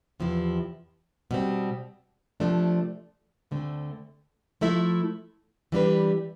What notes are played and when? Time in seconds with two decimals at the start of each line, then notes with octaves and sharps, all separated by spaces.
0.20 E2 C3 F3 C4 E4
1.31 B2 G3 C4
2.40 C3 F3 A3 D4
3.51 D2 D3 A3 C4
4.61 F3 A3 E4 A4 E5
5.72 E3 G3 D4 G4 B4